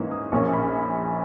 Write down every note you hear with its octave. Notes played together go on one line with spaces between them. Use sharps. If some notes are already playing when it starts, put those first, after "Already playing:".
Already playing: G#2 E3 A#3 C#4
D#6
A#1 A#2 A#3 C#4 C#6
C#6
B5